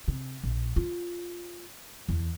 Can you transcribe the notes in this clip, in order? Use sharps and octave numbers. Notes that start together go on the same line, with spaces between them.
C3
A#1
F4
E2